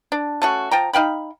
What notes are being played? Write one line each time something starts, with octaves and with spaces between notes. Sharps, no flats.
D4
A3 C#4 F#4
F3 G5 A#5
D#4 F5 G5 B5